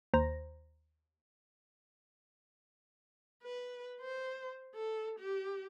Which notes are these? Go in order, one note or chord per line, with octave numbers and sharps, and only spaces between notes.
D#2 C5 A#5 A#6
B4
C5
A4
G4